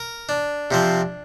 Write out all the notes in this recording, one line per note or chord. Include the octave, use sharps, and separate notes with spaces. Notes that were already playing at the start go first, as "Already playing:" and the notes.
Already playing: A#4
D4
C3 F3 C4